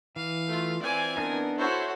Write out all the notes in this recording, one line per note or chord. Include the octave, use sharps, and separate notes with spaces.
E3 F5
A3 F4
E3 C4 F4 D5 G#5
B3 D4 D#4 A#4
E4 F#4 A4 C5 C#5